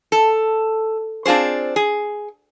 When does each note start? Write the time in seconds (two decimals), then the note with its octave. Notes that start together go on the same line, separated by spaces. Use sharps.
0.12 A4
1.26 C4 D4 F4 G#4 C5
1.76 G#4